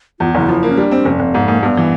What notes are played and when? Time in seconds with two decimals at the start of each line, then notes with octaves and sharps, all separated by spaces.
0.20 E2 F4
0.35 F#1 E4
0.49 F3
0.63 A#3
0.69 C#4
0.77 G3 D4
0.91 C4
1.05 F1 C#4
1.20 F1 C4
1.34 G#2 B3
1.48 G#2 A#3
1.62 G2 B3
1.77 E3